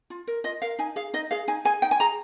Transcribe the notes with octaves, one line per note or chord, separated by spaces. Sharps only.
F4
A#4
F4 D#5
A#4 F5
D#4 G#5
G#4 F5
D#4 D#5
G#4 F5
D#4 G#5
G#4 G#5
D#4 G5
G#5
G#4 A#5